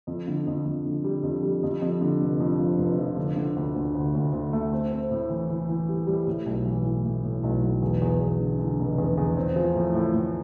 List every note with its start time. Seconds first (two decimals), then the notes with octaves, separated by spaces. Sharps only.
0.07 F2
0.28 D3
0.47 F2
0.66 F2
0.86 D3
1.04 G3
1.23 F2
1.43 G3
1.63 F2
1.82 F2
2.01 D3
2.21 F1
2.40 F2
2.59 F3
2.78 F1
2.99 F3
3.17 D3
3.36 D3
3.56 D2
3.76 D2
3.95 D2
4.15 D2
4.33 D2
4.53 A3
4.73 C4
4.92 C4
5.11 A2
5.30 E3
5.50 E3
5.68 E3
5.89 G3
6.07 G3
6.27 A2
6.46 B1
6.66 E3
6.85 A2
7.05 A2
7.24 A2
7.43 B1
7.63 B1
7.82 E2
8.01 E2
8.20 E2
8.39 D3
8.59 D3
8.79 F1
8.98 E2
9.17 E2
9.37 C4
9.56 F3
9.75 A2
9.94 A2
10.14 A2